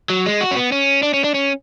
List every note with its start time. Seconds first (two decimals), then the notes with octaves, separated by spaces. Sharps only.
0.10 F#3
0.26 G#3
0.41 F#4
0.51 C#4
0.56 B3
0.72 C#4
1.03 D4
1.14 C#4
1.24 D4
1.34 C#4